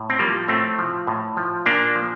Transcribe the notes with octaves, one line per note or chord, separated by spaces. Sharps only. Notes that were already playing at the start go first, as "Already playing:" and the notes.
Already playing: A2
C4
F3 G3 A#3
A2 A3 C4
F3
A2
F3
A#2 A#3 D4
F3